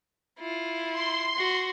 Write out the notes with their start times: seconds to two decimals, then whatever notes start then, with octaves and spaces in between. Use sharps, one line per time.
0.40 E4 F4
0.92 C6
1.37 F#4